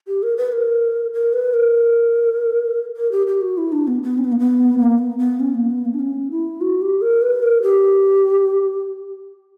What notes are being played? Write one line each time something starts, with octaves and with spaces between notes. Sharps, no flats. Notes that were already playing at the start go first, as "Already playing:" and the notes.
G4
A#4
B4
A#4
A#4
B4
A#4
A#4
G4
G4
F#4
E4
D4
B3
B3
C#4
B3
A#3
B3
A#3
B3
B3
C#4
A#3
B3
A#3
D4
C#4
E4
F#4
G4
A#4
B4
A#4
G4